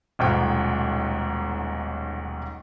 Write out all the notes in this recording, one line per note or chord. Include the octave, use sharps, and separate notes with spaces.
D#1 B1 G#2 G5